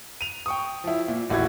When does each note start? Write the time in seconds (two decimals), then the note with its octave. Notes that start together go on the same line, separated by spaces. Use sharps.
0.21 D#7 F7
0.46 G5 C#6 D#6
0.84 F3 E4
1.08 A#2
1.30 D#1 A1 E4 F#4 G4 G#6